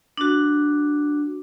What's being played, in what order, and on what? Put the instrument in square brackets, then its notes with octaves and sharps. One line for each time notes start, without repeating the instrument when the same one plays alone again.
[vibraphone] D4 F#4